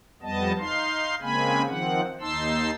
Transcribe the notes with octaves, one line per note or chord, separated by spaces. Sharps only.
F2 G3 B3 D#5 A5
D#4 F5 C6
C#3 G#3 A#3 C4 G#5 B5
D#3 F3 C4 F#5
D#2 D#4 A5 C6 E6